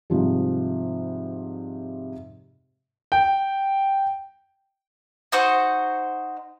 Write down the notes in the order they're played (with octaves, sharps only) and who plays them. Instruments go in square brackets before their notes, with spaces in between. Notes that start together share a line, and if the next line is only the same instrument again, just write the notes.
[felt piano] G#2 C3 F3 G3
[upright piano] G5
[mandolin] D#4 F#4 C5 C#6